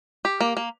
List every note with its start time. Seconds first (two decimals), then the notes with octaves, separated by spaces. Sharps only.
0.25 G4
0.41 A#3
0.57 A#3